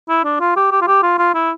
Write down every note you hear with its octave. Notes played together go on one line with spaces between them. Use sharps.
E4
D4
F4
G4
G4
F4
G4
F4
F4
E4